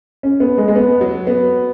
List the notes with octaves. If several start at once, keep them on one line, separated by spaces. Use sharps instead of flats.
C#4
B3
G#3
G#3
B3
F#3
B3